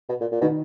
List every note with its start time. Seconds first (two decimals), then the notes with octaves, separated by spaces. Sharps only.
0.09 B2
0.21 A#2
0.32 A#2
0.42 B2 D#3